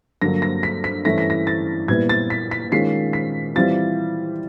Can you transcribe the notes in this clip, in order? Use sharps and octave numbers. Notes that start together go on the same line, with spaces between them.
G2 D3 F#3 A#3 D4 A#6
A#6
B6
B6
G2 E3 A3 C#4 E4 A#6
B6
A#6
A6
A#2 G3 B3 E4 G#6
A6
B6
B6
D#3 G#3 C#4 F4 C7
B6
E3 G3 C4 F4 A6